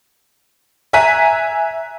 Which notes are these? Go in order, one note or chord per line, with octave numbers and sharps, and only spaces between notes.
E5 G#5 A#5 F#6 B6 D#7